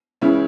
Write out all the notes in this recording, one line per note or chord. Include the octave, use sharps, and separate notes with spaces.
C#2 C#3 E3 C#4 E4